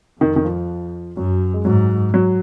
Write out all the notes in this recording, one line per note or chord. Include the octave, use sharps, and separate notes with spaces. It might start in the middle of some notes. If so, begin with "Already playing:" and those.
F2 D#3
D#3
F3
F#2 F#3
G#3
G#2 F#3
F#3